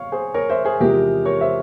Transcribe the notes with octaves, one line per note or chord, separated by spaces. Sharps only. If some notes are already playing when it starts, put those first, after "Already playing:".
Already playing: C#5 F5
G#4 C5
A#4 C#5
C5 E5
G#4 C5
E2 C3 F3 G#3 G4 A#4
A#4 C#5
C5 E5